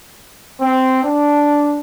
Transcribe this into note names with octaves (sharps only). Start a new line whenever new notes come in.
C4
D4